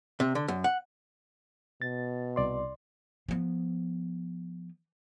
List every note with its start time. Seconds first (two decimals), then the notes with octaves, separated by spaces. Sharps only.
0.20 C3
0.35 D3
0.48 F#2
0.64 F#5
1.82 B2 A6
2.36 C2 D5 C6
3.29 F3 B3